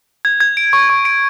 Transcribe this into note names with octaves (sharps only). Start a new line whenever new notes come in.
G#6
G#6
D7
C#6
C#6
D7